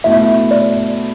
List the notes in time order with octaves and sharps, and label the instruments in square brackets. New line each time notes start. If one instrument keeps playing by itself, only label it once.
[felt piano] B2 A3 E4 [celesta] E5
[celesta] D5